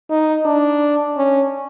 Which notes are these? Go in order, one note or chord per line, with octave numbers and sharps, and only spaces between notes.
D#4
D4
C#4